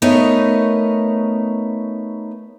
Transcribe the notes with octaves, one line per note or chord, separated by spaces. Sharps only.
A3 B3 D#4 A#4 C#5